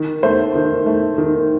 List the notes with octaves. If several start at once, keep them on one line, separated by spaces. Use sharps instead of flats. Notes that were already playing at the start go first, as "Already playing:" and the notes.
Already playing: D#3
A3 C5
D#3
A3
D#3